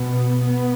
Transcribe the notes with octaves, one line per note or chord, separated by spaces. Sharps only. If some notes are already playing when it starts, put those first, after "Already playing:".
Already playing: B2 B3
B3